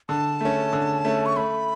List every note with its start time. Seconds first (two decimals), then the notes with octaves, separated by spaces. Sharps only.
0.09 D3 A5
0.41 A3 C#4
0.73 D3
1.05 A3 C#4
1.26 C#6
1.36 A3 B5